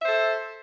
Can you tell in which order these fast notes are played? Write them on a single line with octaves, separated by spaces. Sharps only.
E5 C5 A4